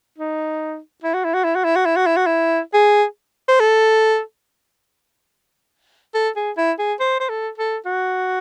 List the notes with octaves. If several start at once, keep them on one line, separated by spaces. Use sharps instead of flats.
D#4
E4
F#4
E4
F#4
E4
F#4
E4
F#4
E4
F#4
E4
F#4
E4
G#4
C5
A4
A4
G#4
E4
G#4
C5
C5
A4
A4
F#4